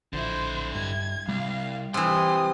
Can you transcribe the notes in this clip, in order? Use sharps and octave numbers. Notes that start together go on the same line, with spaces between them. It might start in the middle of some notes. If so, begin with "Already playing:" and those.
A#1 D3 E4 C5
G2 G#6
C2 G3 F5
C3 E3 C6 D#6